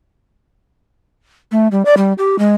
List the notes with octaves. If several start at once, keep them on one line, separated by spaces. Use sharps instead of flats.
A3
G3
D5
G3
G4
G#3